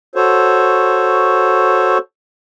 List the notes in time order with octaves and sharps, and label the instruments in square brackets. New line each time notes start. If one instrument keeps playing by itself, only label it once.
[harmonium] F#4 A4 C5 C#5